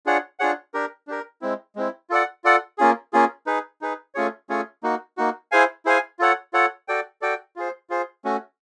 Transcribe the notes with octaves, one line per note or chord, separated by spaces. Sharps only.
D4 F4 G#4 C#5 F#5
D4 F4 G#4 C#5 F#5
D4 G4 A#4
D4 G4 A#4
G#3 C4 E4
G#3 C4 E4
F4 A4 D5 F#5
F4 A4 D5 F#5
A#3 C#4 F4 G#4
A#3 C#4 F4 G#4
D#4 G#4 B4
D#4 G#4 B4
A3 C#4 F4 G#4 C#5
A3 C#4 F4 G#4 C#5
A#3 D#4 F#4
A#3 D#4 F#4
E4 G#4 C5 F5 G#5
E4 G#4 C5 F5 G#5
F4 A4 C#5 F#5
F4 A4 C#5 F#5
F#4 A4 D5 G5
F#4 A4 D5 G5
F4 G#4 C5
F4 G#4 C5
A3 C#4 F#4